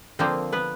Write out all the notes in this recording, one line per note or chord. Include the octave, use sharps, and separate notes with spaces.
D3 F3 A#3 C4 C5
B3 B4